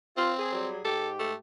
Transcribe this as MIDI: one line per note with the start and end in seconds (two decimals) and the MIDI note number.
0.17 0.68 60
0.17 0.32 65
0.39 0.53 68
0.53 0.80 54
0.53 0.80 55
0.53 0.80 68
0.84 1.36 44
0.84 1.36 67
0.84 1.08 69
1.19 1.34 57